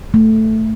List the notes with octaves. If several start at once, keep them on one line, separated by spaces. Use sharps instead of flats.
A3